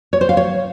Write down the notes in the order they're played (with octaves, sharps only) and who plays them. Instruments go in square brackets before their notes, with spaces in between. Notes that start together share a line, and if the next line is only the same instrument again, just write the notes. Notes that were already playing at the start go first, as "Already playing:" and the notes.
[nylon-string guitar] C#5
C5
F5
C#5